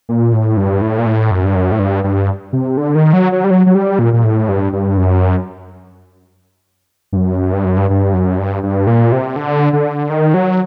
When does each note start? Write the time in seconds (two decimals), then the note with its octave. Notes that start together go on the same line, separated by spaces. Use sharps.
0.09 A#2
0.33 A2
0.57 G2
0.82 A2
0.98 A#2
1.06 A2
1.31 F#2
1.45 G2
1.55 F#2
1.72 A2
1.79 G2
2.04 G2
2.53 C3
2.77 D3
2.95 D#3
3.13 F#3
3.32 F#3
3.44 G3
3.51 F#3
3.66 F#3
3.75 G3
3.99 A#2
4.13 A#2
4.24 A2
4.49 G2
4.73 G2
4.97 F#2
7.13 G2
7.16 F#2
7.53 G2
7.65 F#2
7.77 G2
7.90 G2
8.14 F#2
8.39 G2
8.63 G2
8.87 A#2
9.12 C3
9.36 D3
9.73 D3
10.10 D#3
10.34 F#3